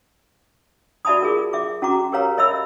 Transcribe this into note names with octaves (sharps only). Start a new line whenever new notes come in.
F#4 D5 E5 A5 B5 D#6
F4 G#4 A#4
E5 D6
C#4 F#4 A#5 D6
G4 A#4 B4 C#5 F5 A#5
A#4 C#5 D#5 E5 B5 E6